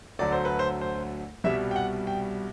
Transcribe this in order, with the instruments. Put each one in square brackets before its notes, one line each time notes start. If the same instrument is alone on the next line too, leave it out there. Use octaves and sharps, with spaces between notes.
[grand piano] D2 D3 F#3 A3 D5
C5
B4
C5
C5
C2 B2 G3 E5
G5
F#5
G5